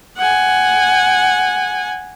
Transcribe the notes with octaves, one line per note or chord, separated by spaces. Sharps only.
F#5 G#5